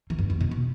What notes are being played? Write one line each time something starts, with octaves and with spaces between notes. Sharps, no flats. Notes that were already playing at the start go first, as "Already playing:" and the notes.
E3
G2
F2
B2
B2